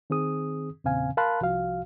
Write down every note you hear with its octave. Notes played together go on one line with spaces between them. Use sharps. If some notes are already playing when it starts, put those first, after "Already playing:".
D#3 C4 G#4 D#6
E2 A#2 C#3 C4 F5 G#5
A#4 F5 A5 B5 C6 F#6
C2 F3 F#4 F5